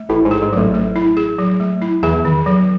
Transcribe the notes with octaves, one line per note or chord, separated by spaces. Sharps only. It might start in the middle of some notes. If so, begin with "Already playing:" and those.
Already playing: A3
A1 A2 E4
G#2
G#4
G#2
F#3
A1 A2
A3
E4
G#4
F#3
A3
E4
E2 E3 G#4
D#3
F#3